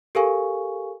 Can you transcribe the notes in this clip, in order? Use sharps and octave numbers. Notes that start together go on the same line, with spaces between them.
G4 A4 A#4 F5 G#5 C#6